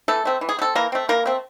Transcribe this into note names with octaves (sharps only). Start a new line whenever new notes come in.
E3 A3 A4
A3 C4
E3
G#4
A3
C4 A4
E3 A#3 A#4
A3 C4
E3 A#3 A#4
A3 C4